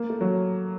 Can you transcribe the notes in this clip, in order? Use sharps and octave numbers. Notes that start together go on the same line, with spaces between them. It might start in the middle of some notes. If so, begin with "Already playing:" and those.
Already playing: A#3
A3
F#3